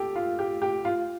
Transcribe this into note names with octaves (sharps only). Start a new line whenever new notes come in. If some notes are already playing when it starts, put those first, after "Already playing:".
Already playing: G4 A4
F4
G4
G4
F4